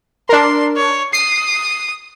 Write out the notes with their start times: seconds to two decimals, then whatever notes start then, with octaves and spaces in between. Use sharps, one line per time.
0.29 D4 A#4 C6
0.76 C#5
1.13 D#6 C7